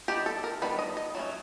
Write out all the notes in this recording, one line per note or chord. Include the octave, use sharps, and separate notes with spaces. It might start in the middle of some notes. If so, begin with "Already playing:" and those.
D#3 G3 B3 D4 G4
A4
A#4
D#3 G3 B3 D4 B4
D#5
D#5
F#3 A3 C#4